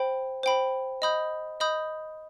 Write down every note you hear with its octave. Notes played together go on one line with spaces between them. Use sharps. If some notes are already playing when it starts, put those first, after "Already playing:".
Already playing: C5 G5 B5
C5 G5 B5
D#5 B5 D#6 G6
D#5 B5 D#6 G6